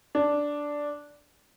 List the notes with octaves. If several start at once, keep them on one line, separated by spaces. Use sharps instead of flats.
D4